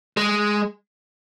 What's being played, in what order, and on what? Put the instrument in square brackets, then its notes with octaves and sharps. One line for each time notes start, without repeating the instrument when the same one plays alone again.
[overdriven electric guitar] G#3